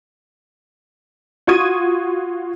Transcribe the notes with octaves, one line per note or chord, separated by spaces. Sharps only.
F4 F#4 C#6 D#6 G#6 D#7